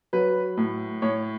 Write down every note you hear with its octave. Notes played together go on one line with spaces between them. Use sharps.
F#3 B4
A2
A2 C#5